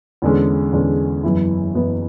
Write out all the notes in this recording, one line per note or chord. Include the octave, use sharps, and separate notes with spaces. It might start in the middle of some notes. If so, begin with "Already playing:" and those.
E2 D3 G#3 C#4
E2 D3 G#3 C#4
F#1 F#2 E3 B3 E4
F#1 F#2 E3 B3 E4